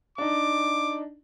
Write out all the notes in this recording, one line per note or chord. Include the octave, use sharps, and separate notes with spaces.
D4 D#4 D6